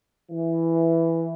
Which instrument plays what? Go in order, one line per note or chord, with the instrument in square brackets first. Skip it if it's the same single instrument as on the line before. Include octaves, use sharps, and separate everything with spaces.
[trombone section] E3